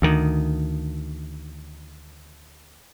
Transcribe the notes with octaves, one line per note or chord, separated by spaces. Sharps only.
D2 D#3